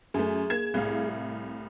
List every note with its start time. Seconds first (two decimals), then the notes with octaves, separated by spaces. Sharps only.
0.14 F#2 A3 G#4
0.50 A#3 G#6 E7
0.74 C2 A2 F5